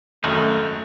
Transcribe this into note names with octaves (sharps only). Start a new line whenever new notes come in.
G#1 F#2 A3 D#4 F4 F#4